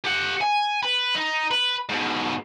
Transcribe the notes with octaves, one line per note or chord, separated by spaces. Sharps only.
G4 F#5
G#5
B4
D#4
B4
G#2 B2